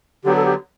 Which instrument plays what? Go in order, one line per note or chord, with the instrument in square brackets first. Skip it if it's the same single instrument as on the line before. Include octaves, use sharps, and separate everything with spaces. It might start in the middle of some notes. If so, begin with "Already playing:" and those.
[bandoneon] D3 F#3 B3 [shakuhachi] G4
[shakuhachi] A4
G4